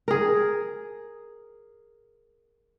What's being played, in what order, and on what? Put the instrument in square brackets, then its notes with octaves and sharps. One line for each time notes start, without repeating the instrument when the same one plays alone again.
[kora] G#4 A#4